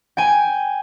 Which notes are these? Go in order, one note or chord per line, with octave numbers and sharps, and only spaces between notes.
G5 G#5